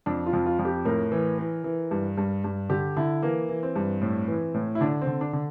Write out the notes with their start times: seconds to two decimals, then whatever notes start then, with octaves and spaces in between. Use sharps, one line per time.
0.06 F2 D4
0.26 F4
0.33 F2
0.46 F4
0.59 F2
0.65 G4
0.85 A2 A#4
1.12 E3
1.38 E3
1.64 E3
1.91 G2
2.18 G2
2.44 G2
2.70 D3 G4
2.97 D3 E4
3.23 E3 A#3
3.49 E3
3.63 C4
3.76 G2
4.02 A2
4.28 E3
4.54 A2
4.75 E4
4.81 D3 D4
5.02 C4
5.07 D3
5.21 D4
5.33 D3